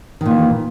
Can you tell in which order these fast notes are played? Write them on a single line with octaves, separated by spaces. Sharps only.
D#3 A#2 E3